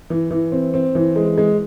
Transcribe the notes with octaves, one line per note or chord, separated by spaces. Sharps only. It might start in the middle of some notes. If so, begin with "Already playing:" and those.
E3
E3
C4
C4
E3
G#3
G#3